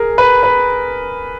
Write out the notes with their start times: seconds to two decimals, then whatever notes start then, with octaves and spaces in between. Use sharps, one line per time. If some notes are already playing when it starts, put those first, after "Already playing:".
Already playing: G#4 A#4
0.18 B4
0.43 B4